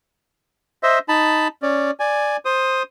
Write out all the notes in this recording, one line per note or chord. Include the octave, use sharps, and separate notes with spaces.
C5 D#5 E5
D#4 A5 B5
C#4 D5
D5 G#5
C5 D#6